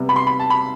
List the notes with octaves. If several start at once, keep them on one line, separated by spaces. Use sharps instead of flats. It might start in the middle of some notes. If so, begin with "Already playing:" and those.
Already playing: C3 G3 B3
B5
C6
B5
A5
B5